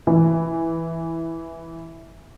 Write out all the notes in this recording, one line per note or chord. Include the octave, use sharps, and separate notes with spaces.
E3